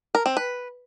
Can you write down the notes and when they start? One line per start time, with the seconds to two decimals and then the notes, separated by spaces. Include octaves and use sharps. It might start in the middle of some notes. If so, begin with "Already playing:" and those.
0.15 A#4
0.26 C4
0.37 B4